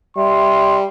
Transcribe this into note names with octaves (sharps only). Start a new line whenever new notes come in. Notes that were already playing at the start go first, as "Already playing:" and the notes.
G3 E5 C6